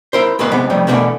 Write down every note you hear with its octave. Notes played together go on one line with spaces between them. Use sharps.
E4 A#4 C5
D2 A2 D#3 A#3 B4 C6
C#2 C3 G#3 B3
F2 A2 C3 G3
B2 D3 E3 F#3 A3 A#3